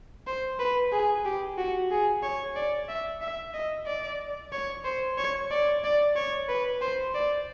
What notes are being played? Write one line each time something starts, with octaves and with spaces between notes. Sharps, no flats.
C5
B4
G#4
G4
F#4
G#4
C#5
D5
E5
E5
D#5
D5
C#5
C5
C#5
D5
D5
C#5
B4
C5
D5